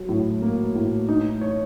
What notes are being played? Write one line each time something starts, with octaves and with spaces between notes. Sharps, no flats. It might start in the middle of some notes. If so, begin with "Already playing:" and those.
Already playing: F#3
A2
A#3
A2
D#4
C#5